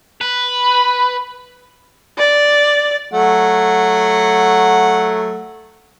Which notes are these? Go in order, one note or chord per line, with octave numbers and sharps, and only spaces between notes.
B4
D5
F#3 A3 F#5